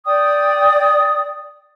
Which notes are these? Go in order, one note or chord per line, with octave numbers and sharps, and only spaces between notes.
D5 G5 D#6